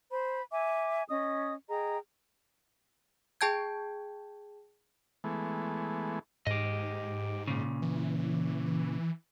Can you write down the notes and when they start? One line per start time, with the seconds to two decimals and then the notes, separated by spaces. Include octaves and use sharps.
0.12 C5 B5
0.52 E5 G#5 D6
1.09 C#4 D#5 D#6
1.69 G#4 D#5 G5 A#5
3.41 G#4 G5 A5 G6 G#6
5.24 E3 G#3 A3 B3
6.47 G#2 G4 D#5
7.48 A#2 C#3
7.82 E3